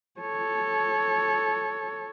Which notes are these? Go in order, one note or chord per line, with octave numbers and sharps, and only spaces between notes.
A4 C#5